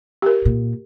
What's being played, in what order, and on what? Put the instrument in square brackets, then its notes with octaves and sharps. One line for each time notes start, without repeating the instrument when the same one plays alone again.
[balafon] G4 A#4
[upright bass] A#2